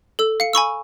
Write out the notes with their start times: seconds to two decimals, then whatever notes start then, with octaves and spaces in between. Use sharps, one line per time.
0.19 A4 E6
0.40 F5 C#7
0.53 G#5 B5 C#6 E6